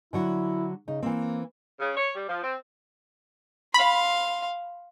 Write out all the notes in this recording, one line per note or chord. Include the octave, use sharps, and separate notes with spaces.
D3 F#3 E4 F#4
C#3 D#4
E3 A#3 C4
C#3
C#5
G3
F3
C4
F5 B5 C6